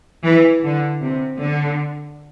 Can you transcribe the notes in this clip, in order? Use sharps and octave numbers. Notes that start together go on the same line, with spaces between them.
E3
D3
C3
D3